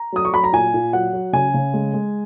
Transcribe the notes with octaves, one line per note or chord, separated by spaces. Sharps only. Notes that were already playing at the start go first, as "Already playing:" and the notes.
Already playing: A#5
F#3 D#6
C#6
F#3 B5
A#5
A#2 G#5
A#2
F#3 F#5
F#3
C#3 G#5
C#3
G#3
G#3